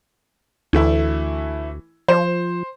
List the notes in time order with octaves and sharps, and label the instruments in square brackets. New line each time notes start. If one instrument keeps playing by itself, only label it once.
[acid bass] D2 [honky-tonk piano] E3 A3 E4
[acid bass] F3 [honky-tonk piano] C5